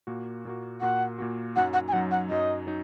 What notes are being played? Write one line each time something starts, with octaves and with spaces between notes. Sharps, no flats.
A#2 A#3 F#4
A#2 A#3 F#4
A#2 A#3 F#4 F#5
A#2 A#3 F#4
F#2 F#3 D#4 F#5
F#5
G#5
F#2 F#3 D#4 F#5
F#5
F#2 F#3 D#4 D#5
F#3 D#4